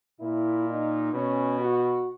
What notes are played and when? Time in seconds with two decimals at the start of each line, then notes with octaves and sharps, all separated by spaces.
0.20 A#2 E4
0.67 D#4
1.12 B2 C#4
1.58 F#4